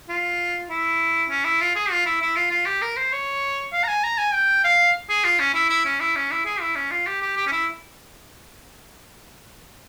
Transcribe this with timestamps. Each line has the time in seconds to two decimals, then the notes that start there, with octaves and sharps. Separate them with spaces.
0.09 F4
0.70 E4
1.30 C#4
1.45 E4
1.61 F4
1.76 G#4
1.91 F4
2.06 E4
2.21 E4
2.36 F4
2.51 F4
2.66 G4
2.82 A#4
2.97 C5
3.13 C#5
3.73 F5
3.84 A#5
3.88 G#5
4.03 A#5
4.18 G#5
4.33 G5
4.64 F5
5.10 G#4
5.24 F4
5.40 C#4
5.55 E4
5.70 E4
5.85 C#4
6.00 E4
6.16 C#4
6.31 E4
6.45 G#4
6.61 E4
6.76 C#4
6.91 F4
7.07 G4
7.22 G4
7.37 G4
7.47 C#4
7.52 E4